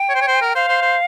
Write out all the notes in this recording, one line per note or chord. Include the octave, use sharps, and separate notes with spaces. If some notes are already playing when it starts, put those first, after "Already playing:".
Already playing: G5
C#5
C5
C#5
C5
A#4
C5 F5
C5
C5